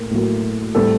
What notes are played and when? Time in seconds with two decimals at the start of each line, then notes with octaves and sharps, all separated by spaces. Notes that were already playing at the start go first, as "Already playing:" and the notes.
Already playing: A2 A#3
0.11 A2 F#3 A#3
0.75 A2 G3 C4 A4